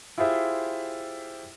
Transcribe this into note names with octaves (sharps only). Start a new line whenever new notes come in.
E4 F4 G4 G#4 C5 E5